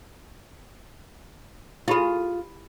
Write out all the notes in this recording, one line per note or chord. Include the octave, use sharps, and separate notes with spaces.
E4 F4 G4 G#4 B5